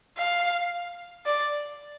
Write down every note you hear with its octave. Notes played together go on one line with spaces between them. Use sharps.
F5
D5